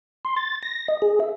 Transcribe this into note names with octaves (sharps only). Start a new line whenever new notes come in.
C6
A6
A#6
D#5
G#4
E5